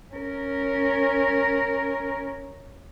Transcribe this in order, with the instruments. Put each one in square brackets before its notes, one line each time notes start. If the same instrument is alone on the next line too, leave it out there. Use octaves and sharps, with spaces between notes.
[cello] C#4 A#4